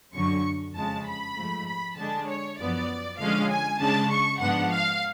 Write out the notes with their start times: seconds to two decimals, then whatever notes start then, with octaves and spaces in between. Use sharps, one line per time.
0.14 F#2 D3 F#3 C#6
0.75 F2 C#3 G#3 A5
1.06 B5
1.36 G#2 F3 A3
1.67 B5
1.97 D3 G#3 D4 A5
2.28 C#5
2.58 F#2 F3 B3 D5
3.19 D3 F3 G#3 C#4 F5
3.49 G#5
3.79 C#3 G#3 D4 A5
4.11 C#6
4.40 G#2 F3 B3 D4 F#5
4.71 F5